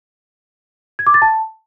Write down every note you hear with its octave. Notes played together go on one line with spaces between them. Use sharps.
G#6
D6
A6
A5